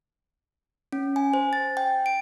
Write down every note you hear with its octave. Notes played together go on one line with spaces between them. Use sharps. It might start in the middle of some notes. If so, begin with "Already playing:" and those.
C#4
G#5
C5
A6
G5
D7